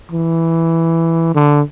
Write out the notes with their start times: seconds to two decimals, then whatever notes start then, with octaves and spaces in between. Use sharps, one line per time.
0.11 E3
1.35 D3